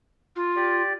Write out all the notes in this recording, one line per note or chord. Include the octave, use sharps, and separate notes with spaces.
F4
G4 D5